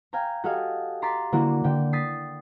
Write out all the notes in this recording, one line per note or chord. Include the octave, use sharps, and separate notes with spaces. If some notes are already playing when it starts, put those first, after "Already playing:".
F5 G5 G#5 A#5
F#4 G4 A4 D#5 F5 G#5
A#5 C6 D6 A6 B6
D3 A#3 E4 F#4
D3 G5
D#6 A6 B6 C7